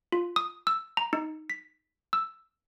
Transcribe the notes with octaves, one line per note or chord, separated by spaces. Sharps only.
F4
D#6
E6
A#5
D#4
B6
E6